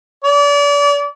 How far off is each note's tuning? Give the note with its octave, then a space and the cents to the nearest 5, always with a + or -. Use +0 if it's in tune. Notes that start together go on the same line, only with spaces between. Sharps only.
D5 -35